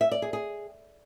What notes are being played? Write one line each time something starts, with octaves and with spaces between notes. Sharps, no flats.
E5
D5
G#4
G#4